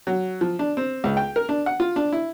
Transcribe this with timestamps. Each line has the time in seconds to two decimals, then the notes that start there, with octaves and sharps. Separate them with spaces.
0.07 F#3
0.41 F3
0.59 D4
0.77 C4
1.04 C#2
1.17 G5
1.36 A#4
1.49 D4
1.66 F#5
1.80 F4
1.96 D4
2.13 E4